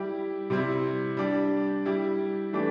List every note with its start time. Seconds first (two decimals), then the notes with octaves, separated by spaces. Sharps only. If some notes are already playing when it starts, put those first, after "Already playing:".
Already playing: G3 E4 G4
0.50 C3 G3 C4 E4
1.17 G3 D4 G4
1.85 G3 E4 G4
2.53 E3 A3 D4 G4